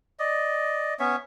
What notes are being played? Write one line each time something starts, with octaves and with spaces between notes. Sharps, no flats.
D5 D#5
B3 C#4 C#5 E5